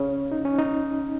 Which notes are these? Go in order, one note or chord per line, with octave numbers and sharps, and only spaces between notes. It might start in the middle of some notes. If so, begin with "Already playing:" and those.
Already playing: C#3 C#4
D#4
C#4
D#4